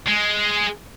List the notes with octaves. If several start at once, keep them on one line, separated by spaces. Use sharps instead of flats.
G#3